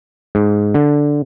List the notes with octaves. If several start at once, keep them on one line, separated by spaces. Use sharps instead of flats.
G#2
D3